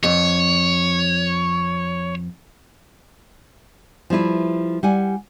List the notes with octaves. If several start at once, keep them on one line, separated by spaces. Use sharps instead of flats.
F2 C#5
F3 G3 E4 B4
G3 F#5 G#5